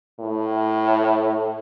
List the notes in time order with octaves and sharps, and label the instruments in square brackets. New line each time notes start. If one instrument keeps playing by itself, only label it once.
[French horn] A2